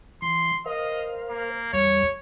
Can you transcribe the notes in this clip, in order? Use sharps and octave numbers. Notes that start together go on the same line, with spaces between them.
E3 C6
A#4 C5 D#5 F5
A#3
E2 G3 C#5